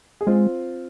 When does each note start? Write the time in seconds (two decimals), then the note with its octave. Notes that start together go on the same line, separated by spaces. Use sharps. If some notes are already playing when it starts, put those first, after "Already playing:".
0.21 G#4
0.27 G#3 C4 F4